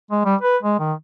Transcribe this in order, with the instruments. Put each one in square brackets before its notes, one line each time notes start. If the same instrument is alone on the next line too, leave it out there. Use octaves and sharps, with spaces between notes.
[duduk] G#3
G3
B4
G#3
D#3